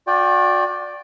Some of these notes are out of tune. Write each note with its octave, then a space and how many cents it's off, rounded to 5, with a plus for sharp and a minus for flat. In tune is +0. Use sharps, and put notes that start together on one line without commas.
F#4 -40 D5 +0 G5 +0